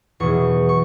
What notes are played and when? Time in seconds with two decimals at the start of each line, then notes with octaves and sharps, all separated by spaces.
0.20 E2 B2 F#3 C#6
0.69 C#6